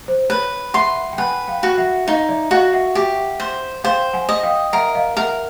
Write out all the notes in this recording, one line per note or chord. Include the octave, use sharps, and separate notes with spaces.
C5
B4 C#5
E5 F#5 C6
G5
B4 F#5 G#5
F5 G5
F#4
E5 F#5
D#4 D#5 F5
D5 E5
F#4 D#5 F5
E5 F#5
G4 E5 F#5
C5
C5 F5 G5
F#5 G#5
D#5
F5 G5
A#4 E5 F#5
D#5 F5
A#4 E5 F#5